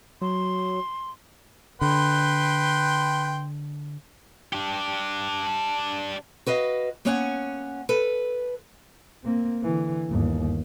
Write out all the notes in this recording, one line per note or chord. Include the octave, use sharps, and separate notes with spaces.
F#3 C6
D3 B4 G5 C6
D4 G4
F#4 B4 D#5 F5
A#3 B3 C#4 C#5 F#5 G#5
A4 B4
A#3 C4
D3 E3
G1 D#2